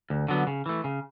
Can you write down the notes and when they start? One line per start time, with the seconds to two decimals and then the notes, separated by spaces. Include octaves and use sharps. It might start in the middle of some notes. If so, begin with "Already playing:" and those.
0.10 D2
0.28 D3 F#3 B3
0.47 C#3
0.66 E3 A3
0.84 C#3